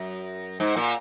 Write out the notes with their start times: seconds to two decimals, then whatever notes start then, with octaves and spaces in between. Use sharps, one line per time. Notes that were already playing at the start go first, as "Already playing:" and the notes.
Already playing: F#2
0.60 G#2
0.77 A#2